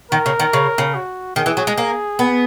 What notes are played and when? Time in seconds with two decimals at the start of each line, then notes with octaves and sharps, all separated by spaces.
0.11 D#3 A#4
0.26 C#3
0.39 D#3
0.53 C#3
0.78 C#3
0.94 F#4
1.36 D#3 G#4
1.46 E3
1.57 F#3
1.67 G#3
1.78 A#3
2.19 B3